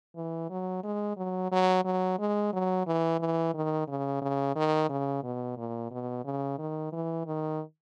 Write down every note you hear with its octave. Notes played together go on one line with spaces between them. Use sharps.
E3
F#3
G#3
F#3
F#3
F#3
G#3
F#3
E3
E3
D#3
C#3
C#3
D#3
C#3
B2
A#2
B2
C#3
D#3
E3
D#3